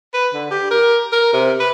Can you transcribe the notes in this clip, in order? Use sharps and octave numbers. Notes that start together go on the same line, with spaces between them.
B4
D3
G4
A#4
A#4
C3
B4